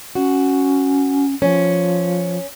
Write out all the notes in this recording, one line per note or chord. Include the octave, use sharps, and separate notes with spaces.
C#4 F#4
F3 C#4